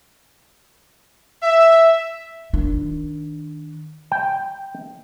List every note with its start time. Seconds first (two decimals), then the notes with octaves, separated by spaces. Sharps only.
1.43 E5
2.53 D#3 D4
4.12 G5